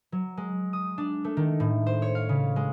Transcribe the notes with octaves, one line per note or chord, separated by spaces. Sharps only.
F#3
G#3
D#6
D4
A3
D#3
A2
C5
C#5
F5
C#3
G#3